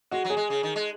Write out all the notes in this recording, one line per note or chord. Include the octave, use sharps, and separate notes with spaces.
G#3 F#4
F#3
G#4
G#3
C#3
D#3
G#3